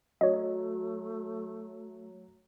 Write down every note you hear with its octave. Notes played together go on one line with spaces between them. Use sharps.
F#3 A3 C#5 D#5